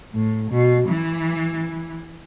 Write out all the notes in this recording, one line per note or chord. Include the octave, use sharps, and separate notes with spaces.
A2
B2
E3